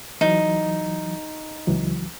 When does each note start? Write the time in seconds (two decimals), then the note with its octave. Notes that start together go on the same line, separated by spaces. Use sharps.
0.21 E3 F#3 D#4
1.67 C#2 E3 F#3